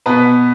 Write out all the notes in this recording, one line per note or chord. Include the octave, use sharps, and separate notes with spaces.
B2 B3 B4